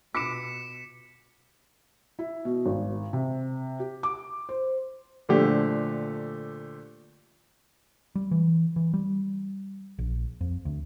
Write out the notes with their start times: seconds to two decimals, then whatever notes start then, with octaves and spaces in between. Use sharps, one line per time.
0.15 B2 F4 D6 B6 C#7 E7
2.19 E4
2.45 B2
2.66 G#1
3.13 C3
3.80 G4
4.03 D6
4.49 C5
5.29 A#2 D3 F3 A3 G4
8.15 G3
8.31 E3
8.76 E3
8.94 G3
9.99 A#1
10.41 F2
10.65 D2